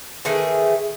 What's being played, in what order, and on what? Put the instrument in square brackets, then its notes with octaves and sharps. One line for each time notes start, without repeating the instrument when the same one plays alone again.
[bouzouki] D#3 E3 A3 G#4